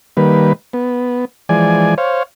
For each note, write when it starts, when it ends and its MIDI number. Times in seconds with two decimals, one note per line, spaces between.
0.17 0.53 51
0.17 0.53 55
0.17 0.53 58
0.17 0.53 71
0.73 1.25 59
1.49 1.94 52
1.49 1.94 53
1.49 1.94 56
1.49 1.94 74
1.49 1.94 80
1.98 2.23 72
1.98 2.23 73
1.98 2.23 77